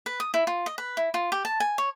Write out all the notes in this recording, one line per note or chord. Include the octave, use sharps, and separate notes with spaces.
B4
D#6
E4
F4
D#5
B4
E4
F4
G4
A5
G#5
C#5